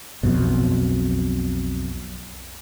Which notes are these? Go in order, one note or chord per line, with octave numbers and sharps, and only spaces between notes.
B1 F2 B2